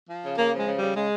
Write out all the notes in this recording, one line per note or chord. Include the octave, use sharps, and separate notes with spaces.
F3
C#3
C#3 A#3
F3 G#3
C#3
G3
C#3
C#3 G#3